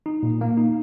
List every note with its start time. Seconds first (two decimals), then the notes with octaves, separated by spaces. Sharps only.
0.06 D#4
0.23 A#2
0.41 A#3
0.57 D#4